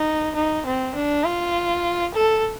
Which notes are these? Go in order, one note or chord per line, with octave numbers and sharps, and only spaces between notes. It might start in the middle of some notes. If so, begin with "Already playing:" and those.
Already playing: D#4
D#4
C4
D4
F4
A4